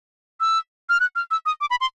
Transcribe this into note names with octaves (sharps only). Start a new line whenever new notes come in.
E6
F6
F#6
F6
E6
D#6
D6
B5
C6